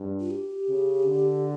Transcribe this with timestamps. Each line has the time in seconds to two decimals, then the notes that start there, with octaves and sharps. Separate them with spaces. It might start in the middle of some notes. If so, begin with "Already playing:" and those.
Already playing: G2
0.20 F4
0.31 G4
0.68 C#3
1.06 D3